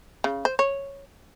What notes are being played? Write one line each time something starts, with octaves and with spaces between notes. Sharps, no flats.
C#3
C5
C#5